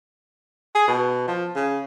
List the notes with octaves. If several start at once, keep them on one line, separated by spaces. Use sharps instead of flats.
G#4
B2
F3
C#3